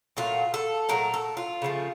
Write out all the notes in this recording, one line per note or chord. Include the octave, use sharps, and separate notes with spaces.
A#2 F#3 A3 F4
A4
A#2 F#3 A3 A#4
A4
F4
C#3 F3 A3